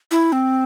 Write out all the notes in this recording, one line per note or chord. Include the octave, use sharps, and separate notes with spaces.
E4
C4